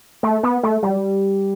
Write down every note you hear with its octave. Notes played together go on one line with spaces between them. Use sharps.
A3
B3
A3
G3